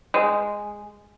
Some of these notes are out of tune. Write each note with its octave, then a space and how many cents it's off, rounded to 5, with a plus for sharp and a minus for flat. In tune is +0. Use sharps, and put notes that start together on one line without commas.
G#3 -5